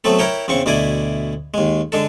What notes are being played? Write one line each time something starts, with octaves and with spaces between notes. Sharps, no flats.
F#3 A3 B3 C4 A4
E4 A#4 C#5 G5
E2 C#3 C4 C#6
D2 B2 E4 D5 G#5
D#2 G#3
D3 G#3 A4